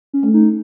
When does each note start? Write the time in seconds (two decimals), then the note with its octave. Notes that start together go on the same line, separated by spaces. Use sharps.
0.13 C#4
0.23 A3
0.34 D#4